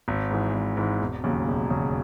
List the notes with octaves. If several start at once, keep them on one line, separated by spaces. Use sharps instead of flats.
G#1
G#2 E3
G#1
G#2 E3
E1
D#2 C#3 F#3
E1
D#2 C#3 F#3